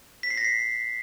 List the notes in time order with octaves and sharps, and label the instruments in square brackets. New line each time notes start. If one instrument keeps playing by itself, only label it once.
[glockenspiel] B6
C7
A#6
C7